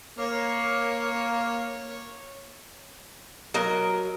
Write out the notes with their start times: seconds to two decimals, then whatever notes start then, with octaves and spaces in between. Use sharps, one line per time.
0.19 A#3 C#5
3.54 F#3 A#4 D#5